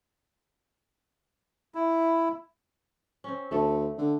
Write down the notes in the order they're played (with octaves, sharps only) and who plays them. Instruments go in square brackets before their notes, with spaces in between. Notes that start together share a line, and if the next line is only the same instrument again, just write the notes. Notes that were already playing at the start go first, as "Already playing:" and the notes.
[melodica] E4
[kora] C4 C#4
[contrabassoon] D2 [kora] A3 A4
[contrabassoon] D3